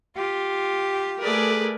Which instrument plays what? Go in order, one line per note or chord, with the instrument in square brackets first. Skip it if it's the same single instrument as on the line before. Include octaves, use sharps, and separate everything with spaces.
[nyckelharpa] F4 [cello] G4
[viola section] A3 G#4 A#4 [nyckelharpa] B4 D5